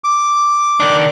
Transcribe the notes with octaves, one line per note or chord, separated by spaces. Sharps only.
D6
D#3 D4